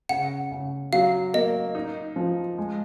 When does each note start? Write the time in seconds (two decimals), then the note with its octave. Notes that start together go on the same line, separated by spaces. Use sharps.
0.09 C#3 F#5
0.51 C#3
0.93 F#3 F5
1.34 A#3 D#5
1.75 D#4
2.16 F3
2.58 G#3